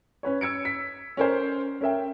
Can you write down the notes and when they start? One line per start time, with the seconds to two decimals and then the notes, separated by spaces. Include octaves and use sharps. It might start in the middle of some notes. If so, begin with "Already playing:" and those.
0.23 C#4 B4 C#5
0.41 E6 G#6 C#7 D7
0.65 B6
1.17 C#4 A#4 C5
1.81 C#4 A#4 E5 G5